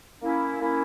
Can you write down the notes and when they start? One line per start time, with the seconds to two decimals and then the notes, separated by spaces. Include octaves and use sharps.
0.22 A#3 C#4 E4
0.61 A#3 C#4 E4